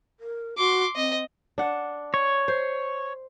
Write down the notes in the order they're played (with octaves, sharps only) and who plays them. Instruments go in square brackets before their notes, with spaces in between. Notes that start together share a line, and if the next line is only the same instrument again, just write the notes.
[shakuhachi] A#4
[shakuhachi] F#4 [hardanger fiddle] C6 D6
[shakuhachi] C4 [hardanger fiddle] D#5
[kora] D4 F#5
[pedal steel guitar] C#5
[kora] C5